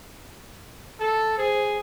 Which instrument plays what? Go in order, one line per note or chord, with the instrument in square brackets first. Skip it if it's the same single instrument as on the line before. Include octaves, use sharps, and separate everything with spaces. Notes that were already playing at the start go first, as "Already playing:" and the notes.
[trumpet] A4
[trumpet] G#4 [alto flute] C5